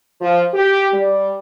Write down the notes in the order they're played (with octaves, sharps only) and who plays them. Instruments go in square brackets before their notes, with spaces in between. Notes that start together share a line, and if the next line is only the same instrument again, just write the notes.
[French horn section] F3
G4
G3